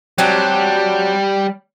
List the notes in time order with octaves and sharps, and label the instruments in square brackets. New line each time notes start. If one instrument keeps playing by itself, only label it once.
[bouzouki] F#3 C4 D4 [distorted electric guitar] G3